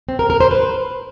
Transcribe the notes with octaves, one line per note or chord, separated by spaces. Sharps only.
C4
A#4
A#4
C5
B4